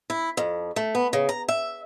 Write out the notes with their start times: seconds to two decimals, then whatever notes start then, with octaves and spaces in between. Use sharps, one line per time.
0.10 E4
0.37 F2
0.76 A3
0.95 B3
1.13 C#3
1.29 A#5
1.48 E5